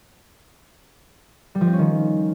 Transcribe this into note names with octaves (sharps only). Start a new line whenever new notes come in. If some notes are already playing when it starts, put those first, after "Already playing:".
G3
F3
C4
C#4
D#3